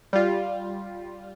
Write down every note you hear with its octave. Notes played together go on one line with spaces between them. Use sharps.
G3 F4